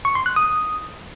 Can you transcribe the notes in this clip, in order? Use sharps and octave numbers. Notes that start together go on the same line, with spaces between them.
C#6
C6
F#6
D#6